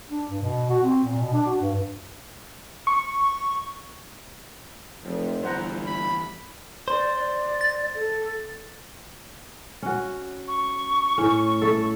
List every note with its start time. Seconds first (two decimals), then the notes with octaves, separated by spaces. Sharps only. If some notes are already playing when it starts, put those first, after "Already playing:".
0.10 D4
0.29 G2
0.42 B2
0.70 F#4
0.83 C4
1.04 A#2
1.18 B2
1.33 D4
1.46 F#4
1.61 G2
2.87 C#6
5.05 F1 F2
5.43 G1 E3 G3 C5 F#5 A#5
5.87 B5
6.88 C5 D5
7.16 D5
7.61 A6
7.95 A4
9.82 C#4 F#4
10.48 C#6
11.18 A2 C#4
11.62 A4 E5